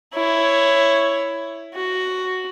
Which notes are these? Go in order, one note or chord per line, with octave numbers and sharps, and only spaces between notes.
E4 C#5
F#4